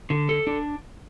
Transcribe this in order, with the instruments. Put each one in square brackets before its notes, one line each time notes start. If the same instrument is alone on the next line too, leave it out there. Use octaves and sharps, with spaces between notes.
[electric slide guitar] D3
A4
D4